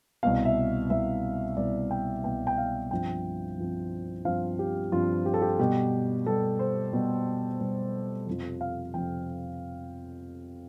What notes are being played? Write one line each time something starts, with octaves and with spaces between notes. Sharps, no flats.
C2 B2 B3 F5
E5
C2 B2 B3 E5
C2 B2 B3 D5
G5
C2 B2 B3 G5
G5
F5
G2 F3 C4 G5
G2 F3 C4
G2 F3 C4 F5
G4
G2 F3 C4 F4
G4
A4
G4
B2 G3 B3 G4
B2 G3 B3 A4
C5
B2 G3 B3
B2 G3 B3
F2 C3 F3
F5
F2 C3 F3 G5